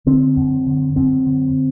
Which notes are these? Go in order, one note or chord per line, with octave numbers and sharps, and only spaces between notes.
D3 C4
F#2
D3
F#2 C4
D3